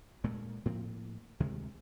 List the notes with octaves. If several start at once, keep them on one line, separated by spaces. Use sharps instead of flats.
D2 A#2 G#3 A3
A2 F3 A#3 C4
D2 C3 D#3 G#3